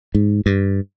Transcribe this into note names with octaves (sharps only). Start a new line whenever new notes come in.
G#2
G2